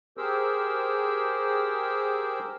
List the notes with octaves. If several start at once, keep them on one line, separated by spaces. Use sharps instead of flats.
G4 G#4 A#4 C5 E6